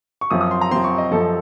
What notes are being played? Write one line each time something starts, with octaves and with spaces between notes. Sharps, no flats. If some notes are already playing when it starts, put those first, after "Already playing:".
C#6
F#2 F3 C4 D#6
D#6
C6
A#5
F#2 F3 C4 C6
C#6
D#5
F#2 F3 C4 A4